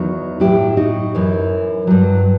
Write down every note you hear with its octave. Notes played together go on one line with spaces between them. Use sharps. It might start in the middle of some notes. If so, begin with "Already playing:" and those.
Already playing: E2 D#3 F#3 D#4 F#4
A2 F#3 E4 G4
D#4 F#4
F#2 E3
G2 F#3